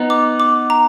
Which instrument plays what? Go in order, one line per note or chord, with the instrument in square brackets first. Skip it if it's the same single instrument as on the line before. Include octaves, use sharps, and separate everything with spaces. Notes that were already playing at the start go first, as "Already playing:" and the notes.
Already playing: [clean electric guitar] B3 D#4
[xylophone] D6
D6
A#5